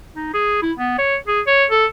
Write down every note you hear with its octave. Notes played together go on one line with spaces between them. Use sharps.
D#4
G#4
E4
B3
C#5
G#4
C#5
A4